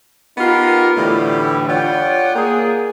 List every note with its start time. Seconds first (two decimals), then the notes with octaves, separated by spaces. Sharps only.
0.38 B3 D#4 F4 G4 A#4
0.97 A2 D3 E3 G3
1.68 F4 C#5 D5 F#5 G5
2.35 A#3 G#4